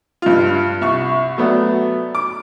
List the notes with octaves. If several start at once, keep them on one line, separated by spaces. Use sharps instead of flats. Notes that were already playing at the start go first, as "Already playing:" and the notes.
G2 F4
C2 C#6
F#3 A3 B3 D5
D6